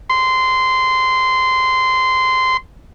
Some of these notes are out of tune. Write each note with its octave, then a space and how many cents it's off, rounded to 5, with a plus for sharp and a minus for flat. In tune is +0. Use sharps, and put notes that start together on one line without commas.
C6 -15